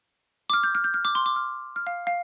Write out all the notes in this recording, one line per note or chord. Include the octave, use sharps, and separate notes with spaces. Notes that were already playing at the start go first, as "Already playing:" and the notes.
D6
F6
G6
F6
G6
F6
D6
C6
D6
F6
F6
F5
F5